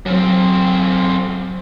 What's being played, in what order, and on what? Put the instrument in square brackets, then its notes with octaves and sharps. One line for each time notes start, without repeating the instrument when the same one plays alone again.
[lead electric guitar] F#2 C4 [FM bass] F#3